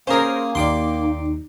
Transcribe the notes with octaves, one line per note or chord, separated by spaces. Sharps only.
A#3 C#4 G#4 A#4 C5
D#2 D#4 D5 G5 C6